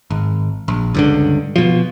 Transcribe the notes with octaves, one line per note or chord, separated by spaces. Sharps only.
G#1
A#1
C#2 G2 D3
B2 F3